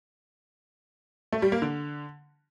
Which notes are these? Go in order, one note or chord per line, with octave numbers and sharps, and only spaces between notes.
A3
G3
A#3
D3